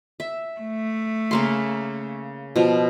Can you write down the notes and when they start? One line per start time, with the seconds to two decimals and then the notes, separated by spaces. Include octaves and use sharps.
0.20 E5
0.60 A3
1.31 C#3 A#3 C6
2.56 B2 F3